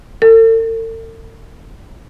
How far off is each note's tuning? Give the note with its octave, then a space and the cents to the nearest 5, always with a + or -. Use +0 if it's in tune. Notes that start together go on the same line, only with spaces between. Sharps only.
A4 +45